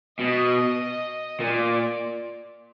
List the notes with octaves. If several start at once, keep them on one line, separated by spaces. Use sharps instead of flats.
B2 D#5
A#2 D5